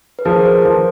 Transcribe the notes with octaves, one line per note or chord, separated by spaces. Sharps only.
B4
F3 G#4 A#4
A#4 C5
F3